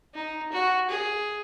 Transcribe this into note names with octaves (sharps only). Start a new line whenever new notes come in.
D#4
F#4
G#4